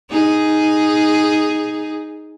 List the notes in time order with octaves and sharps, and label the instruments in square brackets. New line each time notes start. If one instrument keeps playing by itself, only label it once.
[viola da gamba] D#4 G#4